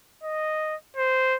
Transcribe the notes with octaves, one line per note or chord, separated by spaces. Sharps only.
D#5
C5